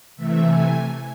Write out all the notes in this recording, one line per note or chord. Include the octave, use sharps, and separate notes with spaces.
C3 E3 A3 E5
G#5